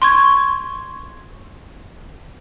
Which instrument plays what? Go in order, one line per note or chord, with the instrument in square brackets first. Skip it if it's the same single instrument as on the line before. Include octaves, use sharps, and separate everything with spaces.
[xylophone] C6 C#6 G#6